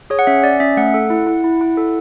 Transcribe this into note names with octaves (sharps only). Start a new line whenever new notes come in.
G#4 C#5
F#5
C#4 E5
C#4 D5
C#4 E5
A3 F#5
A4
E4
E4
E4
E4
A4